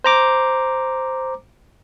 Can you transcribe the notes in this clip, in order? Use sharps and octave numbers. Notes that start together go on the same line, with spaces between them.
C5 A#5 D6